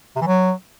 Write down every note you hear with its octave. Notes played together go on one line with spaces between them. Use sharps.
C3
E3
F#3